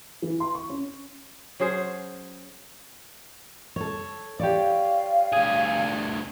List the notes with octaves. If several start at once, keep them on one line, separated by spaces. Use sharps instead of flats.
E3
C6
C#6
C#4
F#3 C#4 G#4 C5
A4 C#5
G4 C#5 D5 F5
D2 G#4